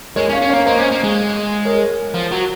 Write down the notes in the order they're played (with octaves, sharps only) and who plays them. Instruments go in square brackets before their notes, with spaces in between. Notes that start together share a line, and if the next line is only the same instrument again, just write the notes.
[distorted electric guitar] G#3 [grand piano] A#4 C#5
[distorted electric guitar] C#4
[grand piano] C#5 F5
[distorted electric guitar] C#4
[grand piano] C#5 F5
[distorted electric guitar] A#3
[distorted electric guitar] A#3 [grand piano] C5 D#5
[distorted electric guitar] C#4
A#3
G#3
[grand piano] A#4 C#5
[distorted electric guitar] F3
F#3